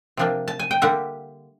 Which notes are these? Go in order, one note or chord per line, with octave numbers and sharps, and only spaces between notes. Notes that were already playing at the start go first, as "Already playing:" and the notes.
C3 F3 A#3 D4
A5
G#5
G5
D3 G3 A#3 E5 F#5